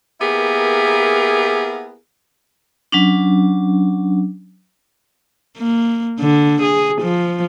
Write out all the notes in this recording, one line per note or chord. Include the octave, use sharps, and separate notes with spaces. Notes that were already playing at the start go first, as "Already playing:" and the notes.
A#3 B3 E4 G4 G#4 A#4
F#3 C#4 D4
A#3
D3
G#4
F3